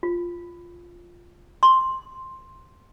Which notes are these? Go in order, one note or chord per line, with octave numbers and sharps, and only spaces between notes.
F4
C6